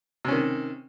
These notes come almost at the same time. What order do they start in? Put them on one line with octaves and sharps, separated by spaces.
C3 C#4 D#3